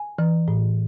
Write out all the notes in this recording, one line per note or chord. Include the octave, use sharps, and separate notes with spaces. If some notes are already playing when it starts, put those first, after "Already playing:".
Already playing: G#5
E3
A2